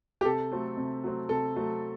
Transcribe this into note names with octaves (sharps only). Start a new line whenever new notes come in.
G4
C3 A4
F#3 A3 C4
C3
F#3 A3 C4
C3 A4
F#3 A3 C4